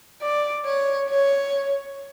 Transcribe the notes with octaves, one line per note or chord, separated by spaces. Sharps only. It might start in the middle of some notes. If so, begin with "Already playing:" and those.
D5
C#5
C#5